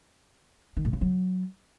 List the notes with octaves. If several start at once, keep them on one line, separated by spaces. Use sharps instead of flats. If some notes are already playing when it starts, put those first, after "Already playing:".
D#3
A2
C#3
F#3